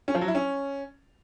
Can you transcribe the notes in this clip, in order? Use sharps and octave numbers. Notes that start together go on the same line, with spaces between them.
C#4
F3
F#3
E4
C#4